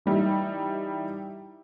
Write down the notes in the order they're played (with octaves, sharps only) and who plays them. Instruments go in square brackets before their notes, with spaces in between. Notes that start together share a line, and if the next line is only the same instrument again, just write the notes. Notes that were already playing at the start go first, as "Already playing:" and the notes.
[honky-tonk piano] E3 G3 D#4 E4